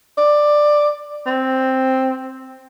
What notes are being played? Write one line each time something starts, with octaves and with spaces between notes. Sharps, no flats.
D5
C4